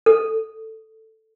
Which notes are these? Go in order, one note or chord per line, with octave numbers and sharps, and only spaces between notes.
A4